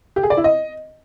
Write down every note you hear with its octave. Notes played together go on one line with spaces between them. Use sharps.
G4
G#4
D5
E4
D#5